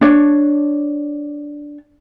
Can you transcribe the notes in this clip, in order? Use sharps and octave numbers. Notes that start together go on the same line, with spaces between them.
D4 C#5